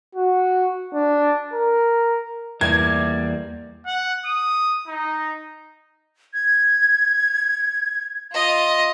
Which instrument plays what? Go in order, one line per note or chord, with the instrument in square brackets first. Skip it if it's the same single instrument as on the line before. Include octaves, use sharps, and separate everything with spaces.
[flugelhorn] F#4
D4
A#4
[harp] E2 [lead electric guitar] G3 A#3 [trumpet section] D5 [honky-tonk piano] G#6
[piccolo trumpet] F#5
D#6
D#4
[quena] G#6
[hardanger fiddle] F4 D#5